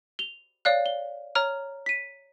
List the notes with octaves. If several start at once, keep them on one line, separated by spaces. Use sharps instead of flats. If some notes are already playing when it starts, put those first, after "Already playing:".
F7 G7
C#5 D5 F5 F#6
G7
C#5 A#5 F6
B6 D#7